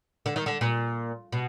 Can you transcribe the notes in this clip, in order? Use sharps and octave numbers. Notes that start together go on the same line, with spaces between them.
D3
D#3
D3
A#2
B2